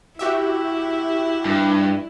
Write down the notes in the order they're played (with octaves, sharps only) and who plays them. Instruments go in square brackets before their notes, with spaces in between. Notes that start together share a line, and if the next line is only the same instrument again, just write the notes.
[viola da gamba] E4 [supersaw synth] F#4 G4 E5
[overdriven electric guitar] G2